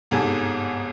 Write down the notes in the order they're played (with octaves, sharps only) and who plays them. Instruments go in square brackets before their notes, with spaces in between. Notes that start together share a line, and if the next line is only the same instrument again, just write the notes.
[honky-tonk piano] G1 C2 G#2 A4 G#5